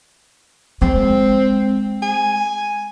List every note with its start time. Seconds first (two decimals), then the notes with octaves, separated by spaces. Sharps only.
0.82 G#3 C4
2.02 G#5